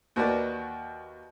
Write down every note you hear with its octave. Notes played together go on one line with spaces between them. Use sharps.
D#2 F#4 A#4 B4 D5